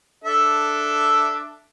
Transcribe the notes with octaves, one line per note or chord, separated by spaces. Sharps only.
D4 A4 E5